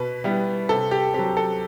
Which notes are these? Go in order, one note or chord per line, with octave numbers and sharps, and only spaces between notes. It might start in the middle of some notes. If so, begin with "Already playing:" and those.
Already playing: B2 B4
G3 B3 E4
C3 A4
G4
F#3 C4 G4
A4